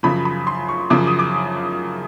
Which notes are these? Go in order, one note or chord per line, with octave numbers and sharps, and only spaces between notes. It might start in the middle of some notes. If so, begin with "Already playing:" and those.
F#2 C#3 F3 B5
B5
C6
C#6
F#2 C#3 F3 D6
D#6
D6